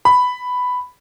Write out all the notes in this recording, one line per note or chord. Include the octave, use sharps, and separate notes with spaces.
B5